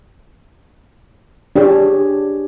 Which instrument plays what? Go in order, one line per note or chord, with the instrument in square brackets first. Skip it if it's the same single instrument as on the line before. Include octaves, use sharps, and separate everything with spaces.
[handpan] D4 G4 G#4 C#5